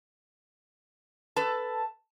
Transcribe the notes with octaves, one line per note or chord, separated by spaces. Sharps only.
A4 B4 A5